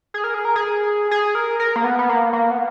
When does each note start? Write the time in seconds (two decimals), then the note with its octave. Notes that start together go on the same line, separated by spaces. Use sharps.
0.14 G#4
0.24 A#4
0.34 G#4
0.45 A#4
0.56 G#4
1.11 G#4
1.35 A#4
1.60 A#4
1.76 A#3
1.84 B3
1.99 B3
2.09 A#3
2.33 A#3
2.51 B3